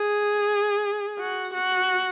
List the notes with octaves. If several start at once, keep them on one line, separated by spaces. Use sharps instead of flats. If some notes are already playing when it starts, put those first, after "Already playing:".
Already playing: G#4
F#4
F#4